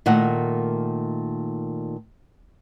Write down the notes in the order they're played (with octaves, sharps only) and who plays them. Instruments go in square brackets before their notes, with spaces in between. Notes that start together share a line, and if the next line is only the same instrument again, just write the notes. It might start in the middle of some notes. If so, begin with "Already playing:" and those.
[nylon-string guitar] A#2 D#3 A3 F#5